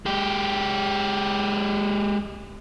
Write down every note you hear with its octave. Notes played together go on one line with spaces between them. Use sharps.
G#3 G4